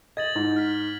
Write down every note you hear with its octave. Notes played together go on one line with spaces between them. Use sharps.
D#5 G#6 A6 F#7
G#2
F6 B6